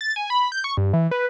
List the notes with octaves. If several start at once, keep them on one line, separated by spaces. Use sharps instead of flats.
A6
G#5
B5
G6
C#6
G2
E3
B4